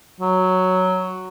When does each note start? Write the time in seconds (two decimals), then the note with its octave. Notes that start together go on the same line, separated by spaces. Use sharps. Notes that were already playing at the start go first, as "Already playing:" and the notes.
0.20 F#3